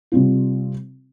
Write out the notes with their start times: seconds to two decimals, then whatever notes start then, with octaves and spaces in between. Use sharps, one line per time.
0.12 C3 G3 C4 F4